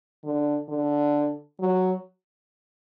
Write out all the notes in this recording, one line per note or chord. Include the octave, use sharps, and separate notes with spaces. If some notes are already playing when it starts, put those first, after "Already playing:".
D3
D3
F#3